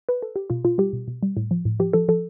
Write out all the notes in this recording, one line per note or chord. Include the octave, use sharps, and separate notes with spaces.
B4
A4
G4
B2 F4
B2 F4
G3 G4
B2
B2
G3
A2
F3
A2
F3 G4
F3 A4
F3 A4